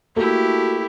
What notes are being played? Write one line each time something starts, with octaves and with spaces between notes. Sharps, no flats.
A3 A#3 E4 F#4 G4 A4